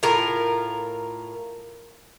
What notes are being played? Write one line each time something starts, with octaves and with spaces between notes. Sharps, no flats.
A2 F4 A#4